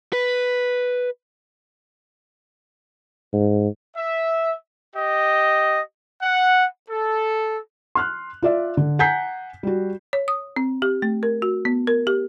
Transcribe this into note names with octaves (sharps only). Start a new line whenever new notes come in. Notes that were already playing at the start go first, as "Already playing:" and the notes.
B4
G#2
E5
G4 D#5
F#5
A4
C6 F6 F#6
F4 D5 E5
D3
F#5 G#5 A#5 G6 B6 C7
G3 F#4
C#5
D#6
C4
G4
A3
A#4
F#4
B3
A#4
G4